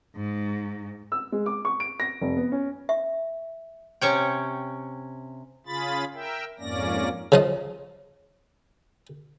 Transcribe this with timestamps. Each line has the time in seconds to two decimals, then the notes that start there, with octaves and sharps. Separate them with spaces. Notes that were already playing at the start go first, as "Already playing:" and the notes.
0.15 G#2
1.12 E6
1.32 G#3
1.46 D6
1.65 C#6
1.80 D7
2.00 A#6
2.21 F1
2.37 B3
2.52 C#4
2.89 E5
4.01 C3 C#4 C#5 G5
5.66 C#3 F4 G#4 B5 A6
6.14 A#4 E5 G5
6.59 F2 G#2 A#3 C#4 D5 A#6
7.32 C#3 F3 D#5